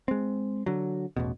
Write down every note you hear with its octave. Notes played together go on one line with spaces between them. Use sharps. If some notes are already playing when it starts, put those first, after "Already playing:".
G#3 C4
D3 F#3
A1 E2 B2